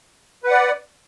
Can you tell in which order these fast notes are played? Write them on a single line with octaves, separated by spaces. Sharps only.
B4 F#5 D5